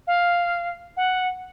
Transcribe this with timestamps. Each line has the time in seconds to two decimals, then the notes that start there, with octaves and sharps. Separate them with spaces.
0.07 F5
0.97 F#5